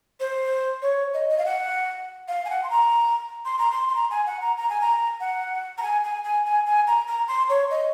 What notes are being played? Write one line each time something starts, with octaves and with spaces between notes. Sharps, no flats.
C5
C#5
D#5
D#5
F5
F#5
F5
G#5
F#5
C6
A#5
C6
A#5
C6
C6
A#5
G#5
F#5
A#5
A#5
G#5
A#5
F#5
A#5
G#5
G#5
G#5
G#5
G#5
A#5
A#5
C6
C#5
D#5